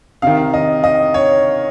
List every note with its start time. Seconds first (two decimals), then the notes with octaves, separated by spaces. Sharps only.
0.22 C3 D#3 F5
0.54 D#5
0.84 D#5
1.14 C#5